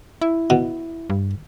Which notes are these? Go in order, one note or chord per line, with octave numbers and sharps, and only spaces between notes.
E4
B2
G2